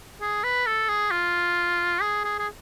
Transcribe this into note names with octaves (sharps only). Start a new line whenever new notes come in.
G#4
B4
A4
G#4
F4
G#4
G#4
G#4